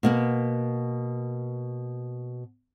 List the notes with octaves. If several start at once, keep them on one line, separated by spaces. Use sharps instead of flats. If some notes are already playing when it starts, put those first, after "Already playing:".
B2 A#3 B3